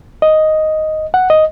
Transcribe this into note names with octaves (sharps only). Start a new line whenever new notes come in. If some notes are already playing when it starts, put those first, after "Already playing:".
D#5
F#5
D#5